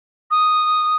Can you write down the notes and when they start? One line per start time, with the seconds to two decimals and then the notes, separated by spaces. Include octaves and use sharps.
0.31 D#6